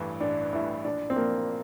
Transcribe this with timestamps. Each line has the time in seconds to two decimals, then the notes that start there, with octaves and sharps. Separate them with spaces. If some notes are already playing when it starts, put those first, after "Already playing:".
Already playing: A1 G2 E3 A3
0.20 A1 D4
0.52 G2 E3 A3 E4
0.84 A#1 D4
1.10 C4
1.16 A#2 F3 A#3